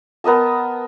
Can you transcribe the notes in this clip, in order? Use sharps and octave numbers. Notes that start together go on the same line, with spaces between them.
B3 A#4 D#5 A5